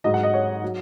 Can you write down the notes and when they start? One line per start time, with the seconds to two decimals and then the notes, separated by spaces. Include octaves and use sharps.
0.04 G#2 F#3 D#5
0.14 F#5
0.23 D#5
0.34 C#5
0.64 F#3